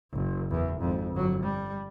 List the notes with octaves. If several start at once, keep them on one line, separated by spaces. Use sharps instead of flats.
F#1
E2
G#1 F2
G1 F#3
G3